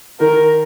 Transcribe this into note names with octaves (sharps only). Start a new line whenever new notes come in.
D#3 A#4